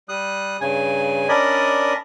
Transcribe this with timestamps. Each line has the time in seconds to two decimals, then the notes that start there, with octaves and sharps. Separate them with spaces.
0.09 G3 D#6 F#6
0.61 G2 C#3 G#5
1.29 C#4 D4 A#4 D5 D#5 B5